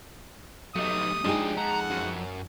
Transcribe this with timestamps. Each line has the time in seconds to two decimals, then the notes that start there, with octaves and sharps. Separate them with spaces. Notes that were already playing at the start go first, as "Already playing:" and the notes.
0.76 F#3 G3 A3 D#4 D#6
1.24 F3 G#3 D4 D#4 G4 G#4 D#5
1.57 F2 F#5 A#5
1.90 F#2